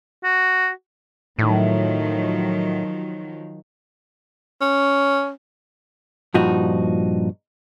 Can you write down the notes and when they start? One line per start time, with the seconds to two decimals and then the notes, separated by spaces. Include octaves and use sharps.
0.24 F#4
1.39 A2 D#3 F3 F#3
4.61 C#4
6.34 G2 A#2 F3 D#4 F#4